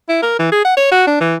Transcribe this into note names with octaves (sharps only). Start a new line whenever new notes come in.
E4
A#4
E3
G#4
F#5
C#5
F#4
D4
E3